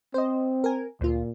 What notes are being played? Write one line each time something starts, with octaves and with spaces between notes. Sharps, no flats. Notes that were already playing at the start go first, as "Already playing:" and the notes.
C4 C5 D#5
A#4 G#5
D2 A#2 F4